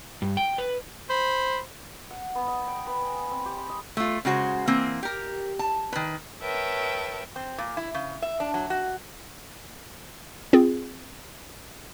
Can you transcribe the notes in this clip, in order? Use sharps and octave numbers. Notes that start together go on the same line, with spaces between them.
G2
G5
B4
C5 B5
F#5
B3
D#5
G5
B4
G#5
C4
G4
B5
D#5
A3 F4
C#3 G#3 F#4 C5
E3 A#3 C4
G4 A#4
A5
D#3 B4
A#4 B4 C#5 E5 G5 A5
C4
A#2
E4
C#3
E5
D4
F#3
F#4
C4 F4 G#4